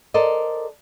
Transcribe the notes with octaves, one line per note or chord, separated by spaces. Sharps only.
A4 A#4 C5 D5 D#5